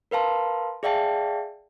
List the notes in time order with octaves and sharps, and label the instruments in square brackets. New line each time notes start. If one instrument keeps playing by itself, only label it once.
[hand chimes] A#4 B4 F5 A5 C6
G#4 D5 E5 F5 G5 A5